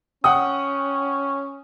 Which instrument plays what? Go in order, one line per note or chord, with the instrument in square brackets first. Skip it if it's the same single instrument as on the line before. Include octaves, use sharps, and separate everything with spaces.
[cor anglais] C#4 [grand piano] F#5 G5 D#6